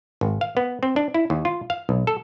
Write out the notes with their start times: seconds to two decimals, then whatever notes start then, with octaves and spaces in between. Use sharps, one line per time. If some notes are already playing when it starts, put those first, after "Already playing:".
0.21 G#1
0.41 F5
0.57 B3
0.83 C4
0.96 D4
1.14 E4
1.30 D#2
1.45 F4
1.70 F5
1.89 B1
2.07 A4